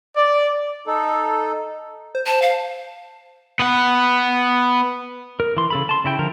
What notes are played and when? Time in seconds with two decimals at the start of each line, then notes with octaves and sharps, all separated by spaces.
0.16 D5
0.87 D#4 A4
2.15 C5
2.26 A5
2.42 F5
3.59 B3 F#5
5.40 A#4
5.57 E3 C6
5.70 C#3 A4 B5
5.89 A5 C6
6.04 C#3 E4 G5
6.19 D3 F3 A#4